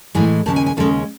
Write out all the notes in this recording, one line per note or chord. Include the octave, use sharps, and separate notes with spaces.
A2 E3 G#3 G#5
D#2 C#3 G#3 C#4 A5
G#5
G#5
D#2 C#3 G#3 C#4 A4